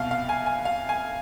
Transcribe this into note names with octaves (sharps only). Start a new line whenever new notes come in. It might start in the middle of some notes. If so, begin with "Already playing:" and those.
Already playing: C2 B2 F5
F5
G#5
G#5
F5
G#5